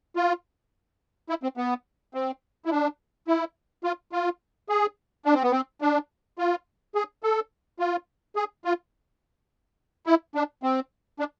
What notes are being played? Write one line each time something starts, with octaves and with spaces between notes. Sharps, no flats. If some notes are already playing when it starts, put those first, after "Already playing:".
F4
E4
C4
B3
C4
E4
D4
E4
F4
F4
G#4
D4
C4
B3
C4
D4
F4
G#4
A4
F4
G#4
F4
E4
D4
C4
D4